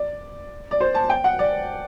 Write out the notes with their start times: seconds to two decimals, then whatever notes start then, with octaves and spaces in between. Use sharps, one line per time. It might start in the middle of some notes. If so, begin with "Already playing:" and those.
Already playing: D5
0.71 D5
0.80 C5
0.95 A5
1.10 G5
1.24 F#5
1.39 D5